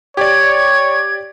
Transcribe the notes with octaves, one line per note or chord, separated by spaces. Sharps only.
G4 C#5 D5 G#6